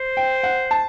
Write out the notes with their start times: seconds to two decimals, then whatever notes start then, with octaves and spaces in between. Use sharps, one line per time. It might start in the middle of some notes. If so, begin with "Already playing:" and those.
Already playing: C5
0.17 G5
0.43 F#5
0.71 A5